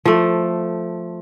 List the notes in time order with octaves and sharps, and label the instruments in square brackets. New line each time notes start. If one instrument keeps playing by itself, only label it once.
[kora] F3 A3